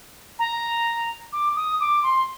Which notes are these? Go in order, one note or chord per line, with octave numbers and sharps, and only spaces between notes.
A#5
D6
D#6
D6
C6